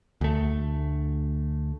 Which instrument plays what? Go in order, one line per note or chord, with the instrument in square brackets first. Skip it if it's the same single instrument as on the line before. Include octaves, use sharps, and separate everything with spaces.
[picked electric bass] D2 A3